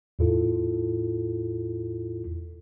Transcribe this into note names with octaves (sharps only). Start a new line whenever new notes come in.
E2 A2 E4 F4 A4